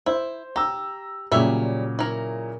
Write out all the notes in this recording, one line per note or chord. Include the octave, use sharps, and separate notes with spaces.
E4 C5
G4 A#5 E6
A#2 C#3 F#3 G3 C#4 E5
E4 A#4